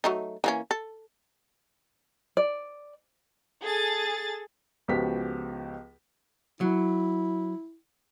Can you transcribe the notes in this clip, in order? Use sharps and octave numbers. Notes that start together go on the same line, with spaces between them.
F#3 A3 D#4
E3 A#3 C#4
A4
D5
G#4 A4 A6
C#2 F3 B3 F#4 G4 B6
F#3 E4